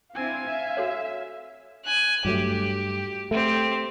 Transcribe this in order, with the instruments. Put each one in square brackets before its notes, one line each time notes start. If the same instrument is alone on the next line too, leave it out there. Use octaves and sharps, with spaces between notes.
[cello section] C4 D4 E4 [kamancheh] F5 [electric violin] G#5
[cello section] E5
[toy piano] F#4 A4 C#5
[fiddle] G#5 F#6
[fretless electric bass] G2 F#3 A3 [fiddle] G4
[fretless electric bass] A3 [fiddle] C4 G4